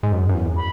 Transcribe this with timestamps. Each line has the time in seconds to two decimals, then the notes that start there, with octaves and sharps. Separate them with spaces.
0.03 G#2
0.12 F#2
0.29 F#2
0.34 E2
0.57 B5